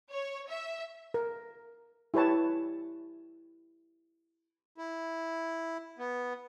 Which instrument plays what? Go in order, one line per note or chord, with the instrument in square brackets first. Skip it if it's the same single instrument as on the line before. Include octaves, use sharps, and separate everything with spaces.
[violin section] C#5
E5
[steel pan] A#4
E4 G4 B4 C#5 A5
[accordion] E4
B3